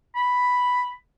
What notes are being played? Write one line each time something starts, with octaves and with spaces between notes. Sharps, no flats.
B5